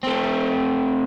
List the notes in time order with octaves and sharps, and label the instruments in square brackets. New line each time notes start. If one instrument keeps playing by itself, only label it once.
[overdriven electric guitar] A3 C4